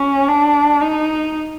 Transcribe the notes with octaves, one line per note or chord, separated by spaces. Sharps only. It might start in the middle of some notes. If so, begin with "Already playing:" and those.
Already playing: C#4
D4
D#4